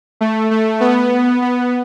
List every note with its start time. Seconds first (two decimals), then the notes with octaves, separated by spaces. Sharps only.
0.21 A3
0.51 A3
0.80 B3
1.42 B3